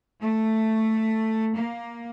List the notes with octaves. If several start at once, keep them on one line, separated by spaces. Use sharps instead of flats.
A3
A#3